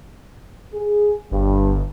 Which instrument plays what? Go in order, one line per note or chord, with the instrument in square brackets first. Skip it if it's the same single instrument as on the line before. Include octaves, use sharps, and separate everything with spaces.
[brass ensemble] G#4
[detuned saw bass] G1 [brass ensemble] G2